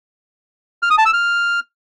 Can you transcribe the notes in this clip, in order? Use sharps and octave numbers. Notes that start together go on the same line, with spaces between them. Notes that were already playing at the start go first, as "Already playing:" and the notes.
F6
D#6
A5
E6
F6